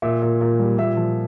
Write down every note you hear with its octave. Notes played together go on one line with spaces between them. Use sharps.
A#2 E5
A#2
A#2
G3
A#2 E5
F3